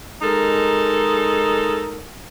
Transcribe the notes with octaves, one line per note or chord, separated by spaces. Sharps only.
G#3 D#4 A4 A#4